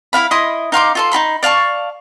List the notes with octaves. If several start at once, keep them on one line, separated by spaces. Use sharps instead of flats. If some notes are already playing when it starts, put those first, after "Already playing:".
E4 F#4 F5 B5
E4 D#5 C6 D#6
D#4 F5 C6 D6
F4 A4 C6
D#4 F#4 B5 C6
D5 F5 A5 C#6